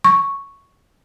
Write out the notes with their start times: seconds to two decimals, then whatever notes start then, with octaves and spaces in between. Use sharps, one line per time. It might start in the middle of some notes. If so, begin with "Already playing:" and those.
0.04 C#6